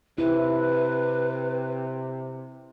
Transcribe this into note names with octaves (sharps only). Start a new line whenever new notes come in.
C3 E4 B4